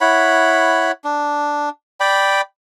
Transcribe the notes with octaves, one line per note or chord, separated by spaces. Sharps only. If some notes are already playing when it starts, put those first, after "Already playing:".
E4 C#5 F#5 B5
D4
D5 G5 B5